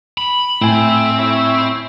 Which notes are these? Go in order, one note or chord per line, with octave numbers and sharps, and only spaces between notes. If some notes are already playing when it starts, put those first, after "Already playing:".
B5
A2 A3 C4 E5 G#5
E4 C#5 E5